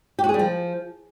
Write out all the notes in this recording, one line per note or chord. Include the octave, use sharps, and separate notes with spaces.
G4
F#4
G#4
G3
F3